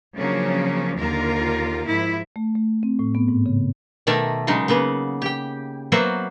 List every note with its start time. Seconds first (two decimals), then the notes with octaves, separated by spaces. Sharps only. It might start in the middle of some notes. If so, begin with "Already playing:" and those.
0.15 C#3 F3 F#3 A#3 C#4 D4
0.97 D#2 D3 A#3 F4 A#4
1.85 G#2 F3 E4
2.36 A3
2.56 A3
2.83 C4
2.99 A2
3.15 B3
3.28 G#2
3.46 C#3
4.07 B2 D#3 A3 A#4 D5 E5
4.47 C#3 F#3 G#3 D#4
4.68 C#3 A#3 B3
5.22 G4 G5
5.92 F#3 A#3 B3 F#4 C5 E5